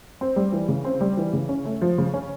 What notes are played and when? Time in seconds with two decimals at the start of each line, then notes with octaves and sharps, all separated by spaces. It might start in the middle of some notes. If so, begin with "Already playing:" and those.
0.21 C4
0.36 G3
0.52 E3
0.68 C#3
0.85 C4
1.01 G3
1.17 E3
1.33 C#3
1.49 C#4
1.65 A3
1.82 F3
1.98 C#3
2.14 C#4